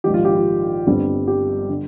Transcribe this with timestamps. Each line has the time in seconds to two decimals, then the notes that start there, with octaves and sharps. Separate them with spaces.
0.04 A#1 G#2 D#3 G4
0.14 F4
0.25 G4
0.35 F4
0.86 G1 G2 D3 G3 C4
1.27 G4
1.69 D3